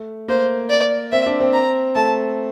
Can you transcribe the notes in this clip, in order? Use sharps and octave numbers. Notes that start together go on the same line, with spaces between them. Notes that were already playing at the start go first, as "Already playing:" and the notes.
Already playing: A3
A#3 C5
D5
C4 E5
D4
C4
A#5
A3 A5